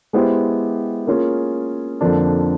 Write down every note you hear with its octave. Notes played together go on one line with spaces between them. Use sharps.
G#3 B3 E4 G4 C5
A#3 C#4 F4 G#4
F2 D3 F3 A#3 D4